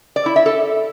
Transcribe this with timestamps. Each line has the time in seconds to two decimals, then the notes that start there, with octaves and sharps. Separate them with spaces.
0.16 D5
0.26 E4
0.36 E5
0.46 A4